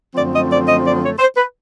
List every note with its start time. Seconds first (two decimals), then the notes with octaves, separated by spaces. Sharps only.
0.14 F#2 D3 F3 A3 C4 D5
0.33 D#5
0.50 D5
0.67 D#5
0.84 D5
1.02 C#5
1.19 C5
1.37 B4